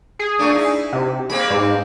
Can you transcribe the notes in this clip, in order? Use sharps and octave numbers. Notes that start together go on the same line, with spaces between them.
G#4
A#2 A3 D4
D#4 E4
C3
G#3 A#3 C4 B5
G#2